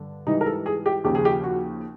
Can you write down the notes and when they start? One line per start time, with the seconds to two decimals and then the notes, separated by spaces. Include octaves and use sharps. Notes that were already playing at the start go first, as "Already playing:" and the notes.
Already playing: G2 D3 D4
0.27 G#2 E3 G3 D#4
0.41 A#4
0.46 A4
0.66 G#4
0.86 G4
1.04 D#2 C#3 F3 G4
1.15 G#4
1.25 G4
1.44 F#4